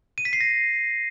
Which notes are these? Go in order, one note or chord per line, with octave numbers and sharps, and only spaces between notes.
D#7
B6
C7
A#6